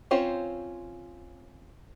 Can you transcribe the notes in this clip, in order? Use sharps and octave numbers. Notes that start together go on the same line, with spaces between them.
C4 C#4 F4 C5 C#5